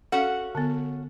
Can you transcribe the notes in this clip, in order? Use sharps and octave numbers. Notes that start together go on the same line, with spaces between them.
C#4 F#4 A4 F5 F#5
D3 B3